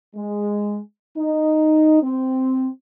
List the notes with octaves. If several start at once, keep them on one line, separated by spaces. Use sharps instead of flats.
G#3
D#4
C4